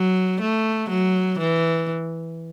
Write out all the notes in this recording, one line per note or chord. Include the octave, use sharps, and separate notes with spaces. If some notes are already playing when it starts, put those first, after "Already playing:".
Already playing: F#3
A3
F#3
E3